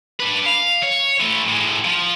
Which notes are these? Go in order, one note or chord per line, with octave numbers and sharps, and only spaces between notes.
D4 B4
F5
C#5
E3 A3
A2 G#3
F3